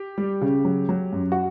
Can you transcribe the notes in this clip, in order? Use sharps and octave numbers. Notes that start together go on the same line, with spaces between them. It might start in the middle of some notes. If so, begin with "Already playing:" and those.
Already playing: G4
G3
C#3
F#3
F#3
F#2
F#4